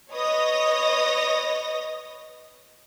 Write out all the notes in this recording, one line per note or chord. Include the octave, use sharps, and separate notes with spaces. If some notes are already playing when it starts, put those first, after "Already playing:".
B4 C#5 D#5 D#6 A#6